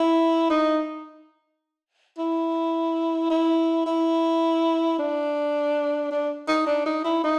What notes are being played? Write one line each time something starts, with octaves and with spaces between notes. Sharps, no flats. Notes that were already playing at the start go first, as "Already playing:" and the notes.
Already playing: E4
D#4
E4
E4
E4
D4
D4
D#4
D4
D#4
E4
D#4